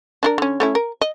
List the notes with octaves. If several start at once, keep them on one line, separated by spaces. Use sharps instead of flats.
D4 E4 A#4
D3 C#4
A3 C#4 E4
A#4
D#5